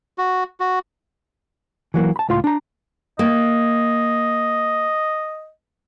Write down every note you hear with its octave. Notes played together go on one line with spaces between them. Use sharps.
F#4
F#4
E3 F#3 A#3 F#4
A5 B5
C#2 A2 F4 F5 C6
D4 A#5
A#3 D#5